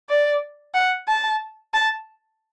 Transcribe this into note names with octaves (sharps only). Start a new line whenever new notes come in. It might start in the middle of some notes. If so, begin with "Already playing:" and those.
D5
F#5
A5
A5